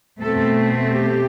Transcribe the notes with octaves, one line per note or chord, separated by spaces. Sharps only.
B2 A3 C4 A4
G4